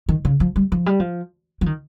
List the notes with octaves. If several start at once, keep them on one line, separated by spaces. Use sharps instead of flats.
D#3
C#3
F3
G3
F3
G3
F3
F3
D#3